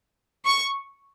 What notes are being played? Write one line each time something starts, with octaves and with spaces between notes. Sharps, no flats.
C#6